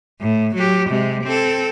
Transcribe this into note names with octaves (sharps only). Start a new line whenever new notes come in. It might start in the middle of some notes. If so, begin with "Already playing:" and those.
A2
F#3 G4
C3 G#3
C4 A4